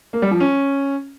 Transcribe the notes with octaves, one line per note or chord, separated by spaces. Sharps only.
A#3
G3
F3
C#4